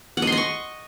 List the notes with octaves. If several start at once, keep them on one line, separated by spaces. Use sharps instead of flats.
F#5
D#5
C6
D#5
C#6